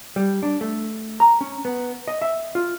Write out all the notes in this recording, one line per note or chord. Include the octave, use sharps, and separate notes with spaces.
G3
D4
A3
A#5
C#4
B3
D#5
E5
F4